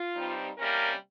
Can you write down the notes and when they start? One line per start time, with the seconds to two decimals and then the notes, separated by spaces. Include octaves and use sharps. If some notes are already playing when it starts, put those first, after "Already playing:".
Already playing: F4
0.15 G2 G3 C4 D#4
0.58 C3 G3 A#3 C#4 A#4